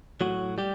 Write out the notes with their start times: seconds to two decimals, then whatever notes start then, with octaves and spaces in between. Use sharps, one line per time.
0.21 A2 F#3 F#4
0.58 G3 G4